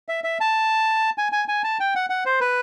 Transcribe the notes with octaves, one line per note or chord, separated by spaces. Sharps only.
E5
E5
A5
G#5
G#5
G#5
A5
G5
F#5
F#5
C5
B4